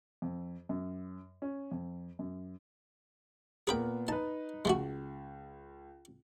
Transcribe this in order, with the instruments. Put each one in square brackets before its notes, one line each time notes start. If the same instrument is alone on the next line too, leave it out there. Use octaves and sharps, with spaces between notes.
[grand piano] F2
F#2
C#4
F2
F#2
[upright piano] A#2 B3 A#4 [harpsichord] G#4 B4 G5
[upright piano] D#4 B4 [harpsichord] A5
[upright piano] C#2 [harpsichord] G#3 A3 F#4